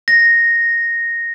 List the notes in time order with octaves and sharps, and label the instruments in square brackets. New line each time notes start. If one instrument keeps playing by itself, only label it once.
[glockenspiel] A#6